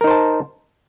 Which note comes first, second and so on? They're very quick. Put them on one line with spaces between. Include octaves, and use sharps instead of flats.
A#4 D#4 C5 A5